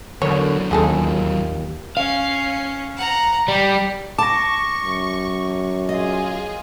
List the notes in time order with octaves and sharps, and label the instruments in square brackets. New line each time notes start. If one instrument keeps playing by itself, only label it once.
[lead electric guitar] E2 F#3 [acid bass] D3 [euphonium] A#4 [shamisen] C#5
[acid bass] D#2 [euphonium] A#2 [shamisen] C#3 G#4 A4
[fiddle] C#4 [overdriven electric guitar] F5
[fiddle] F#5 A#5
[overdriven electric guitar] G3 [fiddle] G4
[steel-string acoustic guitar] A5 [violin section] C#6 [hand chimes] D6 A#6
[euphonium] F#2
[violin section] F4 G#4 [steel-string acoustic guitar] D#5